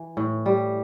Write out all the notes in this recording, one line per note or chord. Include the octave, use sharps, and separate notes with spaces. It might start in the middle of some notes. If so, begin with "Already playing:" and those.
Already playing: E3
A2
G3